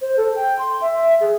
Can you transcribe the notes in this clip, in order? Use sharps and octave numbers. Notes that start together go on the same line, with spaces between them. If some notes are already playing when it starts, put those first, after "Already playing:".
C5
A4
G5
C6
E5
G#4